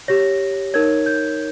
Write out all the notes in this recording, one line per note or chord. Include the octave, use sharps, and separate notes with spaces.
G4 C#5 A#6
D#4 A#4 C#5 G#6
G6